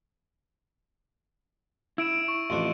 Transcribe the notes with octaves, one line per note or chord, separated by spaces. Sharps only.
E4 E6 D7 E7
C#6
A1 F2 D4